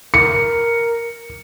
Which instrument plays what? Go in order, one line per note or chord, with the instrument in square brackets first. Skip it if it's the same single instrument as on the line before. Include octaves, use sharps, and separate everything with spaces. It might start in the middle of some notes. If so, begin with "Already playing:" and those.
[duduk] A#4 [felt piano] C#7